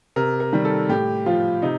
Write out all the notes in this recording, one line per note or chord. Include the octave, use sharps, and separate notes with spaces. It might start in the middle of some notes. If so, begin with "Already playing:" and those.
C3 A#4
A#4
D#3 G3
A4
A2 G4
F3 F4
C3 D#4